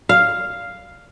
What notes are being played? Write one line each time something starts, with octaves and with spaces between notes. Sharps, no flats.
F5